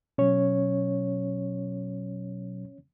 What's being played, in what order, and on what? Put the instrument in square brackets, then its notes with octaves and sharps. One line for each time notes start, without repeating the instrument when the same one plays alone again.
[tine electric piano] B2 F#3 [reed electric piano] C#4 C#5